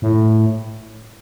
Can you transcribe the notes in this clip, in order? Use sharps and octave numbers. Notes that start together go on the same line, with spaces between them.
A2